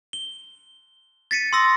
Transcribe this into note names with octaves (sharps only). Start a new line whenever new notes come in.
G7
A6 B6 C#7 D#7
C6 D#6 E6 A#6